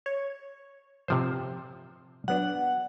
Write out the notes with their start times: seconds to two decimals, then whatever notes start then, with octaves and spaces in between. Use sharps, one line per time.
0.06 C#5
1.08 C3 F3 C5
2.28 F#3 B3 D4 F#5